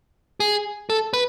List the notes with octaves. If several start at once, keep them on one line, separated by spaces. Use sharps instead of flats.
G#4
A4
B4